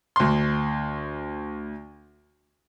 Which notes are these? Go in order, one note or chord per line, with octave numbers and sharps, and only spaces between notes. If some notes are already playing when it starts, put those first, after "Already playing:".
D2 C6